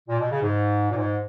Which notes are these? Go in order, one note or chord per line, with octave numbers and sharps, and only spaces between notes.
A#2
B2
C#3
G#2
A#2
G#2